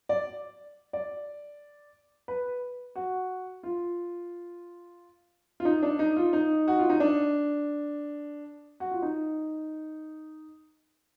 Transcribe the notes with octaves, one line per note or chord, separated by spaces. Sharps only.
D5
D5
B4
F#4
F4
F4
D#4
D4
D#4
F4
D#4
F#4
F4
D#4
D4
F#4
F4
D#4